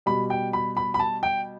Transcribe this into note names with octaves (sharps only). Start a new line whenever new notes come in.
B2 G3 B5
G5
B5
B5
B5
A5
G5